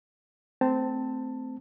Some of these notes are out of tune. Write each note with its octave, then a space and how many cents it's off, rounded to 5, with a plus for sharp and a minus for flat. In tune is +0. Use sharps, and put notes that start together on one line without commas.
A3 +0 C4 -15 A5 +15